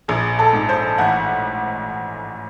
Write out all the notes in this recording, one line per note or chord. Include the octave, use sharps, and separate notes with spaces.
A#1 G#4
A4
G#2
C5
A1 F#5